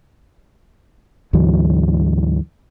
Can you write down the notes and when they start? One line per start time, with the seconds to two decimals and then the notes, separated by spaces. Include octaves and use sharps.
1.33 D2 G#2 E3 F#3